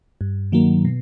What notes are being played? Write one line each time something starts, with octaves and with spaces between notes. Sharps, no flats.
G2
D#3 F#3 A#3
B2